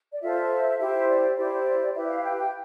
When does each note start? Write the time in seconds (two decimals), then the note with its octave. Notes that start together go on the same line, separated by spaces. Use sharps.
0.13 D5
0.22 F4 A4 C5 E5
0.79 E4 G4 C5 E5
1.09 D5
1.37 E4 G4 C5 D5
1.94 E4 G4 B4 E5
2.09 F5
2.24 G5
2.38 G5